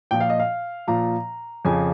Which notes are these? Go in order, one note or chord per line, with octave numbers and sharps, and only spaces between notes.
A#2 F3 G5
F5
D#5
F5
A#2 F3 A#5
F2 C#3 F3 G#5